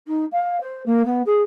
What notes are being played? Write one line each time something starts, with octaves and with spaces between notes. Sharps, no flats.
D#4
F5
C5
A#3
B3
G#4